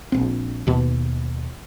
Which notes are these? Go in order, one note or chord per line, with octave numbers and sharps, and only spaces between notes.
A#1 C4
D#2 B2